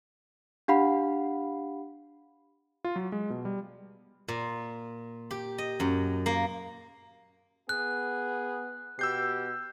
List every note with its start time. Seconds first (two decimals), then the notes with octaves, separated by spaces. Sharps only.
0.68 D4 G4 F5 F#5 B5
2.85 F4
2.96 F#3
3.12 G#3
3.30 B2
3.45 G3
4.28 A#2
5.31 G4
5.58 D#5
5.80 F#2
6.26 A#3
7.69 B3 G#4 F#6
8.99 B2 G4 E6 G6 C7